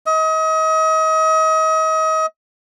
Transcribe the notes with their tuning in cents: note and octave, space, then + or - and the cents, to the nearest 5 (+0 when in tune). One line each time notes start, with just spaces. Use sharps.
D#5 +35